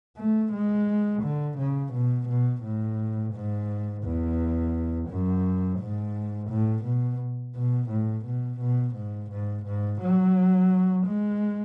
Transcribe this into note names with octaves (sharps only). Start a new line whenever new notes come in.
A3
G#3
D3
C#3
B2
B2
A2
G#2
E2
F#2
G#2
A2
B2
B2
A2
B2
B2
G#2
G#2
G#2
F#3
G#3